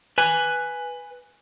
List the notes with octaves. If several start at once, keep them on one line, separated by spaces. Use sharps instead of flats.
B4 G#5